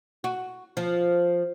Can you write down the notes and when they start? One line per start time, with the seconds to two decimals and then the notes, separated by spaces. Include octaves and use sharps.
0.24 F#4
0.77 F3